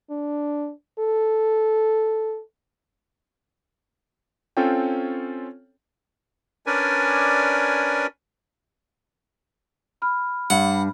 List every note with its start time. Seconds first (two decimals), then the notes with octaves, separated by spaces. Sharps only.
0.10 D4
0.99 A4
4.57 C4 C#4 F4 A4 C#5 G5
6.66 C#4 D4 A#4 B4 D5 G#5
10.02 B5 F6
10.50 G2 F#5